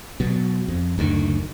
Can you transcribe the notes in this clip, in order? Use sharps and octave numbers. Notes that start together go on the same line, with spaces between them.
B2 F#3
F2
F#1 D2 B2 D#3